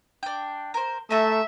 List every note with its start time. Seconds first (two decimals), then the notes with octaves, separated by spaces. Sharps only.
0.23 D4 G5
0.74 A#4 C5
1.11 A3 A4 E5 G#5 A#5